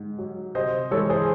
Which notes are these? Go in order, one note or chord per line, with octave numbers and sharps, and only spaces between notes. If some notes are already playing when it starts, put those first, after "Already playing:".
Already playing: G#2
F#3
C3 C5 D#5
E3 G#3 A4 C#5
G#4 C5